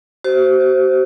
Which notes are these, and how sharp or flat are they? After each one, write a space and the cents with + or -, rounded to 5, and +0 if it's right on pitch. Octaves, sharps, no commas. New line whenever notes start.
F#4 +45 C5 +0